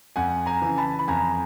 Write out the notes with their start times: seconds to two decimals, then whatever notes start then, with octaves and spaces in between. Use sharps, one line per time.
0.16 F2 F#5 G#5
0.46 G#5 A#5
0.62 C#3 E3
0.78 A5 B5
0.99 B5
1.08 F2 G#5 A#5